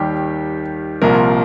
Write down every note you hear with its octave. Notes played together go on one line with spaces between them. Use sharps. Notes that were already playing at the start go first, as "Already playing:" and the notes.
Already playing: D#2 D#3 G3 G4
C2 A#2 F3 A#4